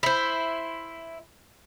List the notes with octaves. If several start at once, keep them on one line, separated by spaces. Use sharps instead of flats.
E4 C5